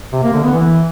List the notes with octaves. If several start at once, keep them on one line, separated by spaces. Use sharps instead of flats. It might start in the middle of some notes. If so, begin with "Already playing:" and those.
C3
A#3
D3
B3
E3